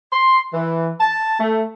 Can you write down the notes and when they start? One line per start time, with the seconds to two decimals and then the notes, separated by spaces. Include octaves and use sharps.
0.12 C6
0.53 E3
1.00 A5
1.40 A3